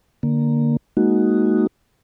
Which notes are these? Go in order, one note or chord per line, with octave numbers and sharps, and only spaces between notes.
D3 A#3
G#3 A#3 D#4 F#4